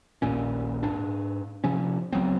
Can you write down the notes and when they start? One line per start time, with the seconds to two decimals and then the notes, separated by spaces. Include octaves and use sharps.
0.22 A#1 D#2 A#2 C#4
0.83 G#2 D4
1.64 C3 F3 C#4
2.13 C#2 F#3 B3 C4